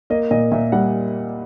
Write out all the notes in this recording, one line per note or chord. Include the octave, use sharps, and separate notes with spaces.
A#3 D#5
A#2 D#5
A#2 E5
G3 F#5